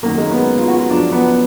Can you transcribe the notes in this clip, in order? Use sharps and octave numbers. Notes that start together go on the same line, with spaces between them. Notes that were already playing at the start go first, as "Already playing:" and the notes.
F#2 D#3 A#3
G#3
B3
F4
F#4
F4
F#2 F3 D4
B3